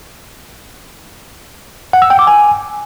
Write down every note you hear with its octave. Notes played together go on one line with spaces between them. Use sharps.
F#5
E6
G5
D6
G#5